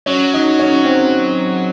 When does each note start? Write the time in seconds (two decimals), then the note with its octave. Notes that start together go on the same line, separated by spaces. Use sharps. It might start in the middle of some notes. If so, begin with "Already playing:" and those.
0.06 F#3 C#4
0.34 D#4
0.59 C#4
0.85 C4